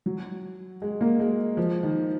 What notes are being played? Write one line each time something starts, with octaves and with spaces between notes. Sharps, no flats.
F#3
G#3
A#3
G#3
F3
D#3